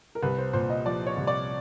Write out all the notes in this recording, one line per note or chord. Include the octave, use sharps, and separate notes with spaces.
A#4
C2 B4
C5
A#2 C5
D#5
F3 D5
C#5
C2
D5